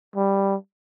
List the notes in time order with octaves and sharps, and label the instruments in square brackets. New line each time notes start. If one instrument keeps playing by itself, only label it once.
[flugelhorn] G3